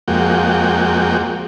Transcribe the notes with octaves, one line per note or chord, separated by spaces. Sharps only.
F2 G#3 A#3 F#4 G5